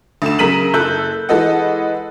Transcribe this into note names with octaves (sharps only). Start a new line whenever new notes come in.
D2 D3 E7
C#3 F#3 A#4 B6 D#7 F#7
F#1 A4 E6 F#6 G6
E3 G#3 A4 B4 D#5 F#5